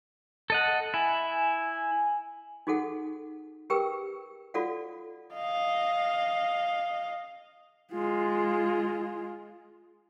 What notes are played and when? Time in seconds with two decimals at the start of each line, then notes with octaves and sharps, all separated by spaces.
0.50 A4 D#5 F#5
0.94 E4 G#5
2.67 D#4 F#4 G#4 A4 F#5
3.70 G4 G#4 A#4 B4 G5 E6
4.54 F4 F#4 A4 D5 F5 F#5
5.34 D#5 F5
7.92 G#3 F4